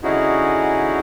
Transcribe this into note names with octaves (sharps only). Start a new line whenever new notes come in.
D3 C#4 D#4 E4 F#4 G#4